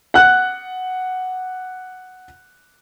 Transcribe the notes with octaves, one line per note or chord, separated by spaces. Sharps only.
F#5 F#6